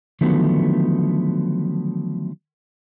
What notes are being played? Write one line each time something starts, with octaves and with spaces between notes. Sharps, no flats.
D3 D#3 F3 F#3 A3 B3